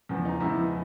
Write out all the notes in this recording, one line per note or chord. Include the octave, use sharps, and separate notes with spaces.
E2 C#3 F3
D#4
E2 C#3 F3 E4